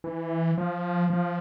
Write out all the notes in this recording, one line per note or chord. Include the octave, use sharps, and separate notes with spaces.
E3
F3
F3